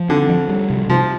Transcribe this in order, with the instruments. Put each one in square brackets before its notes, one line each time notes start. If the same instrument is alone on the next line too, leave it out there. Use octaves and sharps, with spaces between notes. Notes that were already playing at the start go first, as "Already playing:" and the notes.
Already playing: [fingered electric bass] F3
[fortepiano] D3 [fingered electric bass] C4
[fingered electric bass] F3
G3
C3
[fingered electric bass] C3 [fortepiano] F3